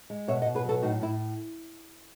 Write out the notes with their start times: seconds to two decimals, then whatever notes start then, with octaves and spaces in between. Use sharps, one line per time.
0.10 G#3
0.28 B2 C#5 E5
0.42 D#5 F#5
0.46 B2
0.55 G#4 B4
0.64 F#3 F#4 A4
0.82 A2 D#4 F#4
1.00 A2 E4